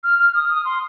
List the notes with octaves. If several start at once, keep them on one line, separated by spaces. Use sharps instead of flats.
F6
F6
D#6
D#6
C6